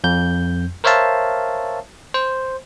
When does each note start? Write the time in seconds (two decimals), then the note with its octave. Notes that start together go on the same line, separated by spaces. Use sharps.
0.04 F2 G6
0.84 A#4 C5 C#5 E5 F5 A5
2.14 C5